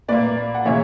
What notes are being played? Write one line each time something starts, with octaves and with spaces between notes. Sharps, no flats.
A#2 A#3 B4 D5
F#5
C#3 E3 A#3 C#5 E5